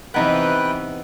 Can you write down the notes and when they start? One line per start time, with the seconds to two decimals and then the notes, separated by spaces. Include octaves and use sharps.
0.14 C3 E3 B3 D#4 B4 G5 F#6